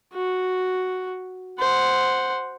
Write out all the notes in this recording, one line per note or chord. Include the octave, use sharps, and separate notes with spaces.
F#4
C5 F#5